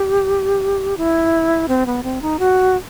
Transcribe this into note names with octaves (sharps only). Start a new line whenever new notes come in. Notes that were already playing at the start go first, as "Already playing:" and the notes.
Already playing: G4
E4
C4
B3
C4
D#4
F#4